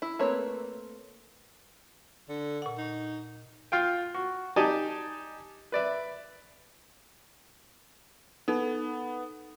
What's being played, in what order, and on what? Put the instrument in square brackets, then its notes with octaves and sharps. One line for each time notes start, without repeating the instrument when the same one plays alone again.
[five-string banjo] E4
A3 A#3 C4 B4 C#5
[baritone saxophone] D3
[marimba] A#2 F#5
[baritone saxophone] D#4
[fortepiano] F4 F5 G5
F#4
D#4 G4 D5 G#5 A5
B4 D5 E5
[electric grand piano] B3 [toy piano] D#4 A4